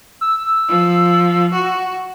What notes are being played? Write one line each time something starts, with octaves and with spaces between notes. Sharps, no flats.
E6
F3
F#4